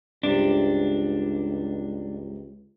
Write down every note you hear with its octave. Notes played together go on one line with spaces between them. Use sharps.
C#2 G2 C3 D4